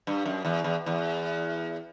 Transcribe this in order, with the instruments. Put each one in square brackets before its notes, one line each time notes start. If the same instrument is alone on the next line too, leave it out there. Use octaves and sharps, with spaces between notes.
[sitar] G2
F#2
E2
E2
E2